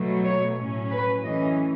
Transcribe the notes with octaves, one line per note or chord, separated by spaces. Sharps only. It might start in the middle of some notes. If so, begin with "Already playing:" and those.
Already playing: B2 F#3 A3
C#5
A2 F#3 C#4
B4
F#2 E3 A3 C#4 D#5